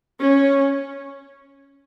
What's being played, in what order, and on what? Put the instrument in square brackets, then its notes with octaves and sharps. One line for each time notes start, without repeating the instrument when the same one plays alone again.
[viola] C#4